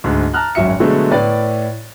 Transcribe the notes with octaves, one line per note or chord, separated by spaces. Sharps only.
D2 G#2
A5 A#5 F6 F#6
G#1 F#2 F#4 E5 C#7
B2 D3 F#3 G#3 A3 B3
A2 B4 D5 A6